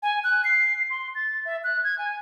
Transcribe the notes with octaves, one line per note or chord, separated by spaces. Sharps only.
G#5
F#6
C7
C6
A6
E5
F#6
G#6
G#5